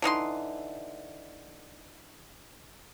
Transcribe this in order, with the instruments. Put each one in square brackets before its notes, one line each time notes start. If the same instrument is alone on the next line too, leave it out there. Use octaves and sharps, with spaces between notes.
[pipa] D3 E3 D#4 C6